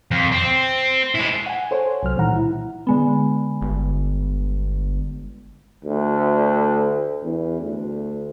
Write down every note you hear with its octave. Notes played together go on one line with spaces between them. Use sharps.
F2
C4
G#3 E4
F#5 G#5
A4 C5 C#5 G#5
C2 F#3 F6
A#2 D#3 E3 G3 F#5 A#5
E4
D3 G#3 B3
G1
D2
E2
D2